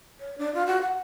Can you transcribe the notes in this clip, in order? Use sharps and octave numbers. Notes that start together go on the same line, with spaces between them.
C#5
D4
F4
F#4
F#5